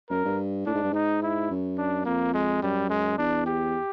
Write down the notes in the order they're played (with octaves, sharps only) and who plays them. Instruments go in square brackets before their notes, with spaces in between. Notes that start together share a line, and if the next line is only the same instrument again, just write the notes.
[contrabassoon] F#2 [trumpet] A#4
[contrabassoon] G2
[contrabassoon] A2 [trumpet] D4
[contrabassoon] G#2
G2
[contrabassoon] G#2 [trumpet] D#4
[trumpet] E4
[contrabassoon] F#2
[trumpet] D4
[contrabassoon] F2 [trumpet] A#3
[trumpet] G#3
[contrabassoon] F#2 [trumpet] G3
[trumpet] G#3
[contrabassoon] E2 [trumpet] D4
[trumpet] G4